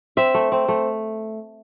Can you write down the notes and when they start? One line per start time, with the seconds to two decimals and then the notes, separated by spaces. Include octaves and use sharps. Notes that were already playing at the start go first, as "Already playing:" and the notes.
0.17 C4 E5
0.34 A3
0.52 C4
0.68 A3